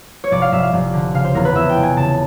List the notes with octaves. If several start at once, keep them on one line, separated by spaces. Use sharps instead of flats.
C#5
F1 D5
F5
F1 E5
F5
F1
D3
C#3 F5
C5
E2 A#4
B4
E2 E5
G5
F1
G#5
C#3 A5